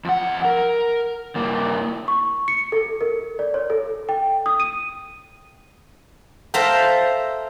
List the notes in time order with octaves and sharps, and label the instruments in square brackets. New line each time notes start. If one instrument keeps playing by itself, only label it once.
[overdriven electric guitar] F2 F#5
A#4
G2 A#3
[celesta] C#6
C#7
A4
A#4
D5
C#5
A4
G5
D#6
D#7
[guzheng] A4 C5 E5 F5 G5 A#5